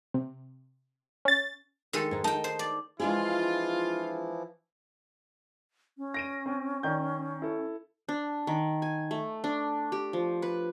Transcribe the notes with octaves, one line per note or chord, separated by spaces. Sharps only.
C3
C#4 A6
D#3 G#3 A4
G#2 D#4
D#4 G5 A5
C5
D5
E3 F3 G#3 D4 E4 F4 G#4
C#4
A#6 D7 D#7
C4
D#3 D5 G6
E4 A4
D4
D#3
G#5
A3
D4
G4
F3
B4